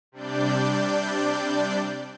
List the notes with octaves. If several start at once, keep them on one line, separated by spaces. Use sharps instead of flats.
C3 G3 D4 D5 G6